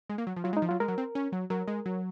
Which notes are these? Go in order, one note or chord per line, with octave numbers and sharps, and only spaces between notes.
G#3
A#3
F#3
F3
F#3 F4
G#3
D#4
F3
F#3 F4
G#3 A#4
F#3
C4
C#4
F#3
F#3 A#4
G#3
F#3